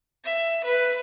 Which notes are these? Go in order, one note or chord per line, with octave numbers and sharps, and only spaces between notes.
E5
B4